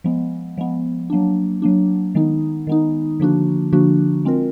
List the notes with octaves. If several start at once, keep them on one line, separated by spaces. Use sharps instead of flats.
F3 G#3 B3
F3 G#3 B3
F#3 A#3 D4
F#3 A#3 D4
D#3 G#3 B3 D#4
D#3 G#3 B3 D#4
D3 F3 A#3 D4 F#4
D3 F3 A#3 D4 F#4
G#3 C4 F4 A#4